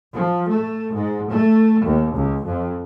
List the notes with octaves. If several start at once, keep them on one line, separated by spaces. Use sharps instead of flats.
F3
A3
G#2
A3
D#2
C#2
F2